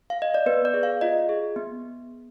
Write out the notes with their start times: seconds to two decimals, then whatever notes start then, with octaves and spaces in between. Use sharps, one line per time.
0.10 F5
0.22 D#5
0.34 D5
0.46 B3 B4
0.65 D5
0.74 G#4
0.83 F5
1.01 F4 D#5
1.29 G#4
1.56 B3